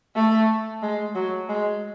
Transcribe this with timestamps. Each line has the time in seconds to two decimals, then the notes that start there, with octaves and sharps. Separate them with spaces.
0.15 A3
0.82 G#3
1.15 F#3
1.49 G#3